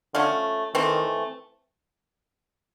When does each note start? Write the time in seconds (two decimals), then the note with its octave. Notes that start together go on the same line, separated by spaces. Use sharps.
0.15 D3 F3 A3 C#4
0.74 D#3 E3 A3 C4